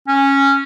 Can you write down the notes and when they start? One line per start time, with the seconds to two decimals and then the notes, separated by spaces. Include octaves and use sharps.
0.08 C#4